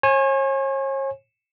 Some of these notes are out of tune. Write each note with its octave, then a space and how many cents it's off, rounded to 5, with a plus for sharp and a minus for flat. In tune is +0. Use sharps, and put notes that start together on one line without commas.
C#5 -40 G#5 +5